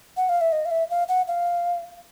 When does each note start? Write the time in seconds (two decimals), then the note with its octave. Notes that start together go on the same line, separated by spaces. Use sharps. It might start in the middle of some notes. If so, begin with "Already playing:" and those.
0.17 F#5
0.29 F5
0.41 E5
0.52 D#5
0.66 F5
0.71 E5
0.90 F5
1.09 F#5
1.28 F5